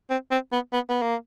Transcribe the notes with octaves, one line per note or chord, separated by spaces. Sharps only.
C4
C4
B3
B3
B3
A#3